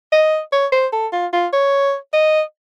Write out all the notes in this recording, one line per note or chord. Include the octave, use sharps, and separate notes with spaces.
D#5
C#5
C5
A4
F4
F4
C#5
D#5